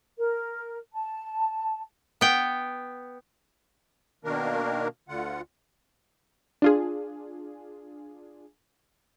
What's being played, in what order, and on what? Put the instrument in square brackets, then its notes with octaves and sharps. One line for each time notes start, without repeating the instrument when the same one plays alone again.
[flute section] A#4
A5
[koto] B3 G5
[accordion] B2 D#3 A#3 D4 A#4
D2 D3 F4 F#5
[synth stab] D4 F4 G#4